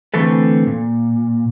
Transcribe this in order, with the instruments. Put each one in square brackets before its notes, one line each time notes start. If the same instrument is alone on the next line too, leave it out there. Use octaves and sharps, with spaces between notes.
[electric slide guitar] D3 E3 A3 C4 A4 B4
A#2